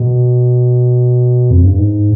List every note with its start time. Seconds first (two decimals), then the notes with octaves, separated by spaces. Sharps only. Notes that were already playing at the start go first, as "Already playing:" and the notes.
Already playing: B2
1.51 F2
1.64 G2
1.78 G#2